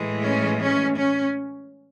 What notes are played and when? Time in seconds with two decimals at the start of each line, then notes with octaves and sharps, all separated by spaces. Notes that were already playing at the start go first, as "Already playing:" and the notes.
Already playing: A2 E3 G#3
0.26 C#4
0.60 C#4
0.96 C#4